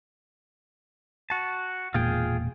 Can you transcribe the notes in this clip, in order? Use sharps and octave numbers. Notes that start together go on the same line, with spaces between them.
F#4 A5
E1 A#2 F4 G#4 G5